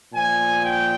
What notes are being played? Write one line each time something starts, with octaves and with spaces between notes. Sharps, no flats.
A#2 F3 G#5
G5